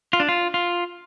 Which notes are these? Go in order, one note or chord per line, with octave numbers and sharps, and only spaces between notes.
F4
D4
F4
F4